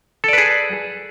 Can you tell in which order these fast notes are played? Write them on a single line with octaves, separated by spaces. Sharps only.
A4 D5 B4 G#4